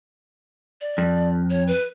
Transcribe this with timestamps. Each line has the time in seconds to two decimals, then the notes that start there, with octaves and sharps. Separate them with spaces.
0.81 D5
0.98 F2
1.50 C#5
1.68 B4